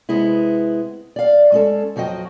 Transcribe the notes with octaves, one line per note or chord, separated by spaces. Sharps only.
C3 G#3 B3 E4
D5 F5
G#3 C#4 A4
F2 F3 F#3 F#4 D#5 G5